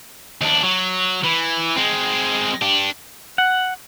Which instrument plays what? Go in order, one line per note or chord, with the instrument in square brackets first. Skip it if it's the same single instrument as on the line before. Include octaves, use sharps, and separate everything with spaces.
[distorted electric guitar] D#2 D4
F#3
E3
G#3 C4
D4 G4
[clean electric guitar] F#5